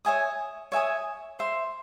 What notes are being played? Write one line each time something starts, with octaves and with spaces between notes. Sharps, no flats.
C#5 E5 G#5 D#6
C#5 E5 G#5 D#6
C5 E5 C6